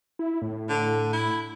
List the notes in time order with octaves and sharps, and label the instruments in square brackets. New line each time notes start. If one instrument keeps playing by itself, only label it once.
[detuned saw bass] E4
A2
[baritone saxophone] D3
E4